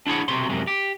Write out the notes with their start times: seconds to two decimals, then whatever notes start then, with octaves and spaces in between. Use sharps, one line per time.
0.07 D4 E4 G#4 F#5
0.28 B1 C3 F#3 C6
0.50 F#2 C3 G#3
0.67 G4